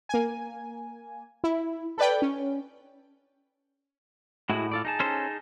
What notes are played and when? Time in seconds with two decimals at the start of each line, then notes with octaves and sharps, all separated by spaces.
0.09 A#3 G#5
1.44 E4
1.98 A4 B4 D5 G5
2.22 C#4
4.50 A2 G#3 E4 F#4
4.72 F4 A4 D5
4.85 D#4 G#4 A5
5.00 C#4 A4 C5